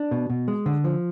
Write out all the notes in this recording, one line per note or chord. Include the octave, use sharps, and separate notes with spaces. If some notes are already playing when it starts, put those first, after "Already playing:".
Already playing: D4
B2
B2
G#3
D3
F3